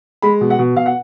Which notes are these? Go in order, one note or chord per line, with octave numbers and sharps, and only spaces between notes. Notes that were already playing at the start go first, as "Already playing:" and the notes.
G#3 B5
B2
F#5
B2
B2 F5
F#5